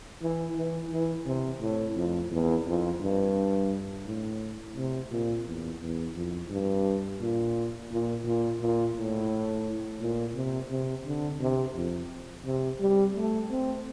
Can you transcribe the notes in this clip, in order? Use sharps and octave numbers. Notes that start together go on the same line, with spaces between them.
E3
E3
E3
C3
A2
F2
E2
F2
G2
A2
C3
A#2
E2
E2
F2
G2
A#2
A#2
A#2
A#2
A2
A#2
C3
C3
D3
C3
F2
C3
G3
A3
C4